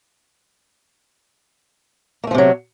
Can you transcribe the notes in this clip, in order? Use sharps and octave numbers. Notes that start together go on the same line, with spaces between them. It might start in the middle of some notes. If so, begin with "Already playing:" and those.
C3 F3 F#3 A3 A#3